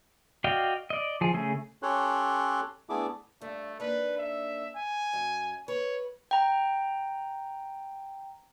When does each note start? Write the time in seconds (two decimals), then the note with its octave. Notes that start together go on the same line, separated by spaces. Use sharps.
0.44 F#4 D5 D#5 F5 G5
0.90 D5 D#5
1.21 F3 G#4
1.33 C#3 A3 G#4
1.83 C#4 G4 A4 C#5 C6 F#6
2.90 A3 B3 D4 E4 G#4 D6
3.41 G2 A3
3.80 A#3 D4 D#4 B4
4.17 E5
4.75 G#5
5.13 F#2
5.68 B4 C#5
6.31 G5 A#5